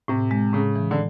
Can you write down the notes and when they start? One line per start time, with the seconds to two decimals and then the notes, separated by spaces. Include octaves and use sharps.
0.08 A2 C3
0.31 G#3
0.53 A2 C#3
0.76 E3
0.91 D3